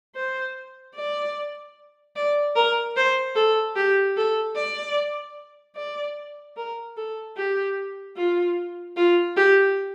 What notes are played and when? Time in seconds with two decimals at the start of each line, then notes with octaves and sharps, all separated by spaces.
0.16 C5
0.96 D5
2.16 D5
2.56 A#4
2.97 C5
3.36 A4
3.76 G4
4.17 A4
4.56 D5
5.76 D5
6.57 A#4
6.97 A4
7.37 G4
8.17 F4
8.97 F4
9.37 G4